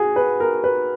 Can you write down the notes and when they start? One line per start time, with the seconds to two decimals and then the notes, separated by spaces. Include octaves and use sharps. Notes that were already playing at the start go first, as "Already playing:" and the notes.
Already playing: F#4 G#4
0.16 B4
0.40 A#4
0.64 B4